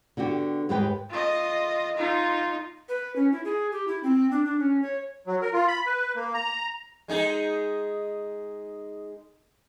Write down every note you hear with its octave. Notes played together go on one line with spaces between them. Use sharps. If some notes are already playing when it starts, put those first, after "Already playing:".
D3 B3 F#4 G4
D#2 G#2 G#3 G4 B4 G5
F4 D#5
D#4 F4
B4
C#4
E4
G#4
G4
E4
C4
D4
D4
C#4
C#5
F#3
A#4
F4
B5
B4
A#3
A#5
G#3 D#4 G#4